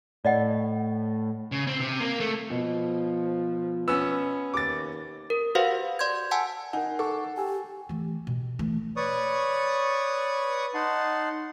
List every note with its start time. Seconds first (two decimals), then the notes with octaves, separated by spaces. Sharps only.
0.25 A2 D5 D#5 F#5
1.52 C#3
1.68 C4
1.80 C3
2.00 A#3
2.20 A3
2.50 B2 F3
3.88 B3 C#4 E6
4.54 D#2 D6 A6
5.30 A#4
5.55 F#4 G4 B4 C5 F5 F#5
5.99 D5 C6 G6 G#6
6.31 F#5 G#5 A5 E6
6.73 D#4 A#4 F#5 G#5
6.99 A4 C#6 D6
7.37 G4 G5 G#5 E6
7.89 E3 A3
8.27 B2
8.59 E3 A3
8.96 B4 C#5 D5 C#6 D#6
10.74 D#4 F#5 A5 C6